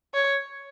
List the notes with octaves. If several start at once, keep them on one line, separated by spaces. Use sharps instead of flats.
C#5